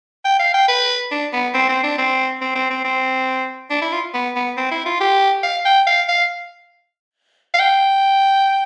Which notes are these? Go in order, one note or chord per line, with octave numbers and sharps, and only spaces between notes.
G5
F5
G5
B4
D4
B3
C4
C4
D4
C4
C4
C4
C4
C4
D4
E4
F4
B3
B3
C4
E4
F4
G4
F5
G5
F5
F5
F5
G5